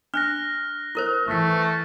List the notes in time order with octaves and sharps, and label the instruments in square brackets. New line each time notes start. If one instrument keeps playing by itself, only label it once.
[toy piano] D4 [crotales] F6 F#6 A#6
[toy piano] E4 A#4 C5
[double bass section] E3 [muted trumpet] A3 [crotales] C#6 B6